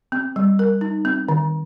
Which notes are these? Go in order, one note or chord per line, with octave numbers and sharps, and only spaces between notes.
C4
G3
A#4
D#4
C4
D#3